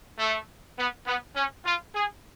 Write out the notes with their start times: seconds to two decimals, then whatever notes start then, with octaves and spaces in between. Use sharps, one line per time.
0.19 A3
0.78 B3
1.07 B3
1.35 C#4
1.65 F4
1.95 G#4